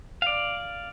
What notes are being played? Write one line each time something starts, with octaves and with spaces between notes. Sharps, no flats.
D5 F5